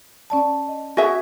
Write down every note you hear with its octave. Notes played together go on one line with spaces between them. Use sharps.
C#4 D5 A5
D#5
F#4 G#4 E5